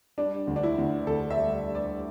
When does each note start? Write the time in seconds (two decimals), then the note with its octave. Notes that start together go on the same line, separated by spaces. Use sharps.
0.18 G3 D4
0.47 D2
0.56 D4
0.63 E4
0.78 D2
1.07 D2 A4
1.30 E5
1.37 G3
1.67 G3
1.75 D5